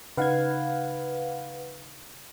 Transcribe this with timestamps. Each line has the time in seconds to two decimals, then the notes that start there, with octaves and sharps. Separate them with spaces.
0.17 C#3 D#4 B4 F5 F#5 G#6